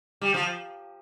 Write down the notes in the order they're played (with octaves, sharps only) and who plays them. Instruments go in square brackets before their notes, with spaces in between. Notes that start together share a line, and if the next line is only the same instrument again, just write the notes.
[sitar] G3
F3